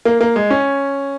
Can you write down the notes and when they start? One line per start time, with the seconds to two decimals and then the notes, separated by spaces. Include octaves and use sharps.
0.05 A#3
0.21 A#3
0.36 G#3
0.50 C#4